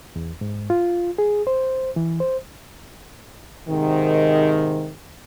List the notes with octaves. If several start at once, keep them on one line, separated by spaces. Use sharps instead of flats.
E2
G#2
F4
G#4
C5
E3
C5
G#2 C3 D#3